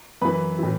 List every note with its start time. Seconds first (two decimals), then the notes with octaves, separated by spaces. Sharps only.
0.21 F#2 E3 B4 B5
0.59 A2 E3